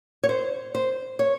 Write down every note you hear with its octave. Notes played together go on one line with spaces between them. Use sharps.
C#5
C5
C5
C#5